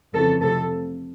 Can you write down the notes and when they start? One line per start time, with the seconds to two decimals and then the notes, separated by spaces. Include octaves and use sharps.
0.13 F2 C#3 E3 A4
0.42 F2 C3 F3 A3 A4